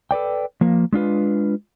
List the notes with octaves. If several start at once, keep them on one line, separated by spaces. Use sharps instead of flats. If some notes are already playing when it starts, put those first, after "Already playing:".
A4 B4 D5 G5
F3 A#3
G#3 D4 F4 B4